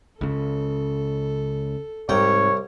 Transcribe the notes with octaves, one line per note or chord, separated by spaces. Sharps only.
C#2 C#3 A4
C2 G#2 C3 C#5 G5 A#5